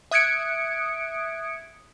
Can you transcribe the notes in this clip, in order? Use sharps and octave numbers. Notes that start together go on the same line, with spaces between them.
E5 D#6 F#6 G#6 C#7 D7